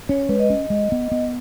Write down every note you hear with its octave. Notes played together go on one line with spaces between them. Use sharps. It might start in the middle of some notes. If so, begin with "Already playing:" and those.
C#4 C#5
C#5
G#3 B4
D#5
C#4
G#3
B3
B3